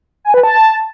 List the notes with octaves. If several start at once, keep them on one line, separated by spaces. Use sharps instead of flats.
G#5
B4
A5